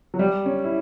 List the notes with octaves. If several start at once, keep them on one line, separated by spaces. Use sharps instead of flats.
F#3
G3
C#4
E4